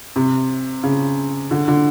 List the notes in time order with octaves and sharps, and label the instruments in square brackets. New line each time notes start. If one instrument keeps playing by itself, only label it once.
[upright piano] C3
C#3
D3
D3